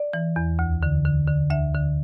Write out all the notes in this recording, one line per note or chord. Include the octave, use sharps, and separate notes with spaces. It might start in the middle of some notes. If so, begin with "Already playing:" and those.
Already playing: D5
E3
E2
D2
D3
D3
D3
D2 E5
D3